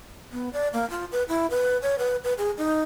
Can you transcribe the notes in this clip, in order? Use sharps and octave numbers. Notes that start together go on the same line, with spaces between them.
B3
D5
A#3
F4
B4
E4
B4
C#5
B4
B4
G#4
D#4